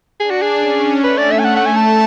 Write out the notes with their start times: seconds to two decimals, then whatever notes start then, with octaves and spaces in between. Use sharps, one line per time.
0.19 D4 G#4
0.31 F#4
0.42 G#4
0.61 C#4
1.03 A3 B4
1.18 D5
1.31 E5
1.39 G#5
1.45 F#5
1.56 F#5
1.66 G#5
1.76 A5